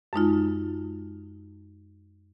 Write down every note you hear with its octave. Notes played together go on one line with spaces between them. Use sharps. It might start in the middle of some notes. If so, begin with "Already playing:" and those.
F#2 G#3 D#4 F4